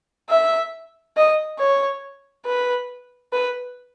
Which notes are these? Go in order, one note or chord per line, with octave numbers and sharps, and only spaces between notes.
E5
D#5
C#5
B4
B4